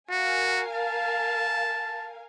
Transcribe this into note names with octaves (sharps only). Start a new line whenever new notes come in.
F#4 A#4 F5 G#5
A5